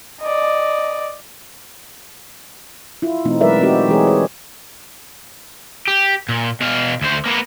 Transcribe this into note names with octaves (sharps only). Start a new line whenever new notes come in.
D5 D#5
E4 F4
B2 E3 A3 C4 D#4
F#3 G#3 A#4 B4 D5 E5
C4 D#4 F#4 G4
E3 G#3 G#4 C#5
C#5
G4
A#2
B2 F5
D2 C5
A#3 B3